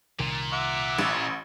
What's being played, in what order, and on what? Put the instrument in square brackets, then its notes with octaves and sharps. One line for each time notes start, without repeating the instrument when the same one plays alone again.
[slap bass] C2 D#3 [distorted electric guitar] A#2
[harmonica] E5 F#5 D6
[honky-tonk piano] A1